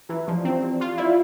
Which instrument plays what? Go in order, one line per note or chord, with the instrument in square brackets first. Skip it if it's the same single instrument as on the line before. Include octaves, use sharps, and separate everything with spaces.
[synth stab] E3 [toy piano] E4
[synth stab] F3 [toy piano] G4 D5
[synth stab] C4 [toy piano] E4
[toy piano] G4 D5
[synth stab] F4 [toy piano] G4
[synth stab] E4 [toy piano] D5 F5